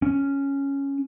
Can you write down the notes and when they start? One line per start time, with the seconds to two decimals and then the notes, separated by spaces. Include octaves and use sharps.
0.02 C#4